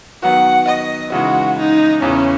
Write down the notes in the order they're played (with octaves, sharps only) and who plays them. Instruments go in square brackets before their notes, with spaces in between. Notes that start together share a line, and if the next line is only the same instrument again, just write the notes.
[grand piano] D#3 F#3 B3 F#4 [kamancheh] F#5
[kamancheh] D#5
[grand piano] C#3 E3 G#3 D#4 [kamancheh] F#4
[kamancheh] D#4
[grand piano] E2 C#3 E3 [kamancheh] C#4